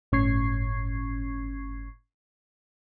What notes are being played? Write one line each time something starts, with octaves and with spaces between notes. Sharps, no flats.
G1 A2 C#4 C#6 G#6 C7